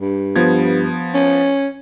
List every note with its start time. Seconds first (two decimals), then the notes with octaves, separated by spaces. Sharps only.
0.01 G2
0.36 F3 B3 G#6
1.14 C#4